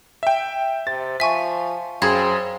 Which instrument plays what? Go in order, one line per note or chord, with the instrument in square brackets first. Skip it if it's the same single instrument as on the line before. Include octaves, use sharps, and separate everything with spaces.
[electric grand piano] E5 G5
[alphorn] C3 [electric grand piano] A6
[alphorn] F3 [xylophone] E5 G#5 [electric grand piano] C#6 B6
[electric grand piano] F#2 G#4 [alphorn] C4 [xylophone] F5 B5 G#6